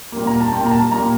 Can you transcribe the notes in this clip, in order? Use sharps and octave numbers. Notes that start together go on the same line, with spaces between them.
A#2 G3 A#3
A#5
A5
A#2 G3 A#3 G5
A#5
A5
A#2 G3 A#3 A#5